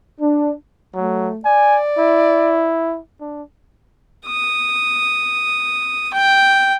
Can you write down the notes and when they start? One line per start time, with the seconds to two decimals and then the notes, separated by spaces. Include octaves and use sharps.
0.20 D4
0.95 F#3 A3
1.45 D5 G#5
1.98 E4
3.20 D4
4.26 D#6
6.13 G5